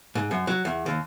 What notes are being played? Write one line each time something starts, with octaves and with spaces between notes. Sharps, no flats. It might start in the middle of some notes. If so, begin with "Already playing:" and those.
G#2
F#2
F#3
E2
D#2